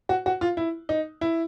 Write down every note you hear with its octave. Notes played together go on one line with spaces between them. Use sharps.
F#4
F#4
F4
E4
D#4
E4